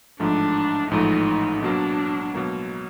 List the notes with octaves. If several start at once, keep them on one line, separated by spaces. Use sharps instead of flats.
A1 G#2 F3 A3 D4
A1 G#2 F3 A3 D#4
B2 F#3 A#3 D4
B2 F#3 A#3